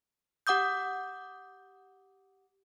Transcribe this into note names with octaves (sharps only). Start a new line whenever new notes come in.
G4 F#5 D6 D#6 G6